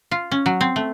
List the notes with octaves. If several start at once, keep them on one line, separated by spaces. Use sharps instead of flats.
F4
C#4
F#3
C4
A3